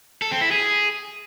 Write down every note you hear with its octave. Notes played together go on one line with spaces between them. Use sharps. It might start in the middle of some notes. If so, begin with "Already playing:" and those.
A4
C4
E4
G#4